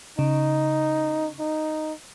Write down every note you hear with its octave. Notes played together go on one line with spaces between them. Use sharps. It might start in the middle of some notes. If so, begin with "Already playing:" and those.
C#3 D#4
D#4